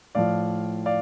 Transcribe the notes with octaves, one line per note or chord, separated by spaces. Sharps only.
A2 F3 D5 F5
D5 F5